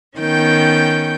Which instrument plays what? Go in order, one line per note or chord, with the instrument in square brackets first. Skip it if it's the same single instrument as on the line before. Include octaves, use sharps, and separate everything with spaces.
[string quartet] D#3 B3 C#4 G5 G6